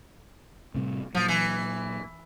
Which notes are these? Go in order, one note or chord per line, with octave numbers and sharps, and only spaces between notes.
A2 C3 G3
A#2 F3 F#3
E3